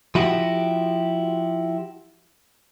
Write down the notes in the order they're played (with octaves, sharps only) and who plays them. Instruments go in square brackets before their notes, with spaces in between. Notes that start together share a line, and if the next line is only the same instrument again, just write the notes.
[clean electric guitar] F3 E4 F#4 G4